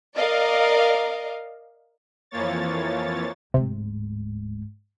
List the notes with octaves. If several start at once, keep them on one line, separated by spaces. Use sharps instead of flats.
A#4 D5 D#5 F5
F2 E3 F3 A#3 C#5 A6
D1 G#2 C3